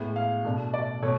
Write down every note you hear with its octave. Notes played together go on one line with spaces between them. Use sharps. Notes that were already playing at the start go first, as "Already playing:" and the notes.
Already playing: A2 G#3 B3
F5
B2 A3 D4
D5
B2 A3 C#5